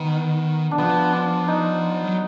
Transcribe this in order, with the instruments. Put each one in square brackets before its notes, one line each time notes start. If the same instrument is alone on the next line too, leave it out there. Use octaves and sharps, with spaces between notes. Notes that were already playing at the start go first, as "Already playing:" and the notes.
Already playing: [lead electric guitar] D#3 [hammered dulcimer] B3
[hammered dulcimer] D4
[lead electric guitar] F3 [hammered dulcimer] B3
[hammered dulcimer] D4
D#4
[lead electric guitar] F#3